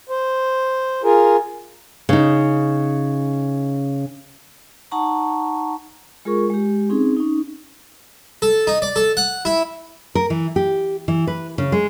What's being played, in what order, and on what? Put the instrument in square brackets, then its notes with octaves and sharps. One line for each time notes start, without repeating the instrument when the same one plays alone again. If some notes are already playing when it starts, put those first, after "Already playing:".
[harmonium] C5
F4 G#4 A#4
[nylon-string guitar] C#3 D#4
[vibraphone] D#4 F#5 A5 A#5 C#6
G#3 F4 G#4 A#4 C#6
G#3 G4
C4 C#4 D#4 G#4
C#4 D#4
[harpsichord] A4
D#4
D5
A4
F#5
E4
[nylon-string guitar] A#4
E3
G4
E3
B4
C#3
G#3